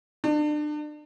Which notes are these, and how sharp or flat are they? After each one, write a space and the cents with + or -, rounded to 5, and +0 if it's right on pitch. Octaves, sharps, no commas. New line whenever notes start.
D4 +35